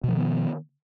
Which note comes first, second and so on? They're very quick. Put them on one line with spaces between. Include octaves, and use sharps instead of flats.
B2 F3 D#3 B3